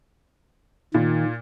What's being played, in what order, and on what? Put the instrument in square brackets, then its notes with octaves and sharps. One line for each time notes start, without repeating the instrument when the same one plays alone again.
[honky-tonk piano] A#2 [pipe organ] D#3